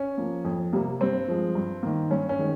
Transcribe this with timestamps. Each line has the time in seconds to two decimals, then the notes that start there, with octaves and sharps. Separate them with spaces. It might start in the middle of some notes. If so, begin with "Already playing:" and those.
Already playing: C#4
0.18 F3 A#3
0.45 F2
0.73 C3 G3 A#3
1.01 G2 C4
1.28 F3 G#3
1.55 G2
1.83 D#3 A#3
2.11 G2 C#4
2.29 C#4
2.39 D#3 G#3